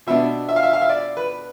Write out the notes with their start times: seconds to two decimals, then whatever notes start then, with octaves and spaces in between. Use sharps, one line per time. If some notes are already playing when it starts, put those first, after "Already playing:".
0.07 B2 B3 D4 E5
0.49 E5
0.56 F5
0.63 E5
0.73 F5
0.82 E5
0.89 D5
1.17 B4